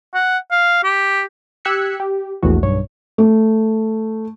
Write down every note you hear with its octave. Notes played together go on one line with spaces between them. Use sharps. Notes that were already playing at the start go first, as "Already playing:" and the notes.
F#5
F5
G4
G4 E6 F#6 G#6 B6 C#7
G4
A#1 E2 A2 E3 F#4
B1 G2 C#5
A3